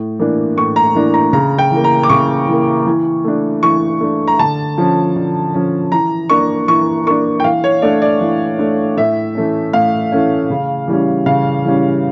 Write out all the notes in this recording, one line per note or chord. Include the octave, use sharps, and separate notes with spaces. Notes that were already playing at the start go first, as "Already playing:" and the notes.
Already playing: A2
E3 A#3 D4
A2 C#6
A#5
E3 A#3 D4
A#5
C#3 A#5
G5
E3 A#3
A#5
D6
C#3 C#6
E3 A#3
E3
A3 D4
E3 C#6
A3 D4
A#5
D3 A5
F3 C#4
D3
F3 C#4
E3 A#5
A#3 D4 C#6
E3 C#6
A#3 D4 C#6
G5
E3 F5
C#5
A3 D4 D5
D5
E3
A3 D4
A2 E5
E3 A3 C#4
A2 F5
E3 A3 C#4
C#3
E3 G3 C#4
C#3 F5
E3 G3 C#4